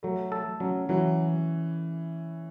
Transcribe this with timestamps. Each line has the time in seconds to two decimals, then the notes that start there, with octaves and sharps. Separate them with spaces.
0.03 F#3 A3
0.32 A3 A4
0.60 F#3 C#4
0.89 E3 F#3